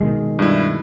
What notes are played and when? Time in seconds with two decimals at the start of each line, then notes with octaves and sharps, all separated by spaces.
0.01 B2 D#3 G#3
0.39 G2 E4